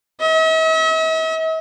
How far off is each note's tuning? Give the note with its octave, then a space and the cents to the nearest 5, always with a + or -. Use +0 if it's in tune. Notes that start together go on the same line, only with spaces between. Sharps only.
E5 -45